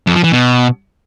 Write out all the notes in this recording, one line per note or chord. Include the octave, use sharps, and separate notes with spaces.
F2
F3
E3
B2